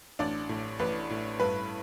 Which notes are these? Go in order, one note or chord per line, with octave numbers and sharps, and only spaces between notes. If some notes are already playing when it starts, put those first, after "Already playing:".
A1 D4 D5
A2
A1 B4
A2
G2 B4